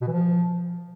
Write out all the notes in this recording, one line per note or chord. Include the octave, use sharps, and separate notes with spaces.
B2
E3
F3